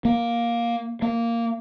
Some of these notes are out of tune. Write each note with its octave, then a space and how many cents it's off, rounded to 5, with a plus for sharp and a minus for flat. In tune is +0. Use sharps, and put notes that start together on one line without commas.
A#3 +10
A#3 -10